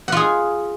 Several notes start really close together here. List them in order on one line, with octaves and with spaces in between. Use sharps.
F#5 F4 G#4